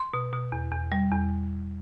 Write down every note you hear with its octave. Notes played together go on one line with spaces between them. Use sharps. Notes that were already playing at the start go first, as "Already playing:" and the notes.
Already playing: C6
B2
B2
E2
E2
G3
E2